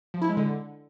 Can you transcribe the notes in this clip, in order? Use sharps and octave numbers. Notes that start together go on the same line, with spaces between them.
F3
E4
G#3
D3